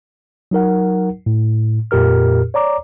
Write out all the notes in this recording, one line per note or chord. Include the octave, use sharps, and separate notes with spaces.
F#3 D#4 A#4 F#5
A2
F2 A#2 G4 A#4 F6
C#5 D5 A#5 D6